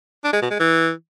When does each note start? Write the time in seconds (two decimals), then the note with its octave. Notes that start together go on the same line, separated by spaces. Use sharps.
0.24 D4
0.33 G#3
0.42 B2
0.51 G#3
0.60 E3